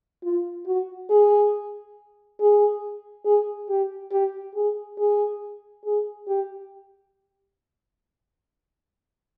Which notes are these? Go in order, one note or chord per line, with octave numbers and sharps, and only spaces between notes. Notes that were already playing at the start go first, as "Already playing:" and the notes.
F4
F#4
G#4
G#4
G#4
G4
G4
G#4
G#4
G#4
G4